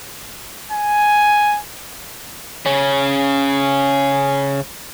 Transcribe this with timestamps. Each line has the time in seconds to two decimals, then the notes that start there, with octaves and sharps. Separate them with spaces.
0.72 G#5
2.66 C#3 C#4